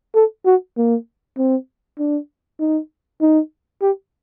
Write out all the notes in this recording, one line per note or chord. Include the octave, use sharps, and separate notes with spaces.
A4
F#4
A#3
C4
D4
D#4
D#4
G4